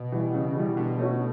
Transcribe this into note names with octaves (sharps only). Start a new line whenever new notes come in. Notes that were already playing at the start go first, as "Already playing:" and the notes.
Already playing: B2
E3 G3
C#3
E3 G3
B2 D3
A3 C#4 F#4